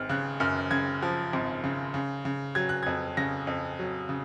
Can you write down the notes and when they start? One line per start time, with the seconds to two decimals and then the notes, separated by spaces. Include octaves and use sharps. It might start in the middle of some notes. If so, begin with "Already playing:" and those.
Already playing: G#1 F6
0.09 C#3 F#6
0.40 F#2 F6
0.71 C#3 G#6
1.02 F3
1.33 G#1
1.64 C#3
1.94 C#3
2.25 C#3
2.55 F#3 G#6
2.69 F#6
2.83 F2 G#6
3.17 C#3 A#6
3.47 F2
3.79 F#3
4.09 C#3